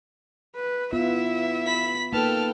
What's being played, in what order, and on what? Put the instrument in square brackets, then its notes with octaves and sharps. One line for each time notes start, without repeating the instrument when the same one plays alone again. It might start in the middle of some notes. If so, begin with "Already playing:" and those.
[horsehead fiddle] B4
[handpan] B3 F4 [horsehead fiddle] E4 E5
[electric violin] B5 B6
[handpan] A#3 D#4 B4 [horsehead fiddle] A4 G5 [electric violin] A5 F6